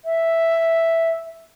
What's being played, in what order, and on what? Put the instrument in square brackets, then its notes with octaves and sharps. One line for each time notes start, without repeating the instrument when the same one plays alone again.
[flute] E5